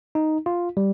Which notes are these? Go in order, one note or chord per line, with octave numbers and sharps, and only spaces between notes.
D#4
F4
G3